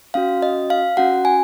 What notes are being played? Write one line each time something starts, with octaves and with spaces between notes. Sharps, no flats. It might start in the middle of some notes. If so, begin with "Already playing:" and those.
C#4 F#4 F5
D#5
F5
C#4 F#4 F#5
G#5